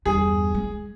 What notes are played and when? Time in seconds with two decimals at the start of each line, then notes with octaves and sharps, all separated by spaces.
0.06 E2 G2 G#4
0.54 G#3